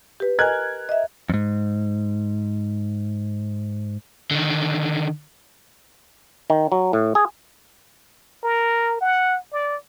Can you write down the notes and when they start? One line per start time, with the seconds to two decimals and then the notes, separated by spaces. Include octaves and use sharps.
0.20 G4 B4
0.39 A#4 D#5 G#5 F#6 G#6
0.89 D#5 E5
1.30 F2 G#2
4.31 D3 D#3
6.50 D#3
6.72 F#3
6.93 A2
7.15 G#4
8.43 A#4
9.01 F#5
9.52 D5